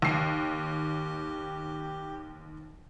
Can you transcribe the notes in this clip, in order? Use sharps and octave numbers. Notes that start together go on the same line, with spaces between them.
D#2 G4 C7